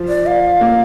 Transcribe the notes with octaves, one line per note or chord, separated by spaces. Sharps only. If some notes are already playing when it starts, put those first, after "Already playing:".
Already playing: F3
D5
F5
A#3